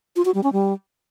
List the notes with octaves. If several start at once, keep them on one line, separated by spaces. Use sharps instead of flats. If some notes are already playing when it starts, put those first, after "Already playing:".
F4
F#4
G3
C#4
G3